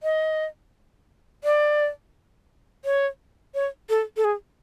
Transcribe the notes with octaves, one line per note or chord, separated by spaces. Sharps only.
D#5
D5
C#5
C#5
A4
A4
G#4